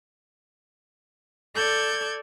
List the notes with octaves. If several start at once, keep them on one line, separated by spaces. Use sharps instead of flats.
A4 D5 G6 G#6